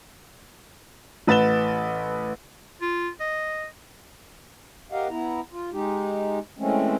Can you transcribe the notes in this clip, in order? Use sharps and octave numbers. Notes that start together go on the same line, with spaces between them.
A1 B4 A6 E7 G7
F4
D#5
G4 A#4 D#5 F5 F#5
B3 E4 A#5
F4
G#3 D#4 G4
E3 G#3 A3 C4 C#4